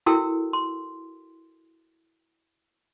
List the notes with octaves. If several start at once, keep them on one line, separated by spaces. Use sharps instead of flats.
E4 F#4 A4 A#4 G5 E6
C6